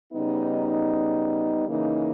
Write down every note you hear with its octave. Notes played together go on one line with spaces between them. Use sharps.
C#3 G3 B3 D#4
C#3 E3 A#3 D#4